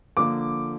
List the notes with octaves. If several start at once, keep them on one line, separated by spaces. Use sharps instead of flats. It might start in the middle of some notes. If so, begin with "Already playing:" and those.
D3 F3 A#3 D6